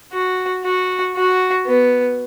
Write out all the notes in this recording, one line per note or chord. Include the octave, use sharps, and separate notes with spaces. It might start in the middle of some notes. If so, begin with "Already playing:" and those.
F#4
F#4
F#4
B3